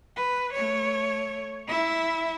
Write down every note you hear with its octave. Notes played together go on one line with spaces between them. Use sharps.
B4
A3 C#5
E4 E5